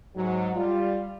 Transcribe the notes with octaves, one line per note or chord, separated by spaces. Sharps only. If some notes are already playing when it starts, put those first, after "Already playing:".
G#2 F#3
G3 F4